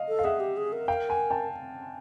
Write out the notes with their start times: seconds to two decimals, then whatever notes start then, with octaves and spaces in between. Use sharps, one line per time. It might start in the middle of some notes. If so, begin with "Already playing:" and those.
Already playing: D#5 F5
0.08 A4
0.19 F5
0.24 G#4 E5 F#5
0.40 G4
0.57 G#4
0.73 A#4
0.88 F5 G5
1.09 F#5 G#5
1.30 G5 A5